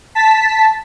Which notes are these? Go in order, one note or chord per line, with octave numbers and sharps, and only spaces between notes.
A5 B6